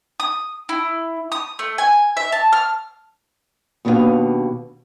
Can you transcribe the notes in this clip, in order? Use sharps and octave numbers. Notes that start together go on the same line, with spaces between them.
D#6
E4
D#6
A3
G#5
E5
A5
F6
D#2 B2 D4 A#4 B4 F5